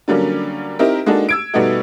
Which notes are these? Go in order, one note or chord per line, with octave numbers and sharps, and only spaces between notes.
D3 F#3 G3 A#3 C#4
C4 D#4 E4 G4 A#4
G#3 A#3 D4 D#4 F#4 A4
E6 G#6 D7
B2 G3 A3 B3 D#4 F#4